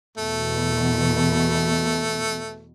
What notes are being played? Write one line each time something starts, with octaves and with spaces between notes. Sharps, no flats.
E2 B2 A3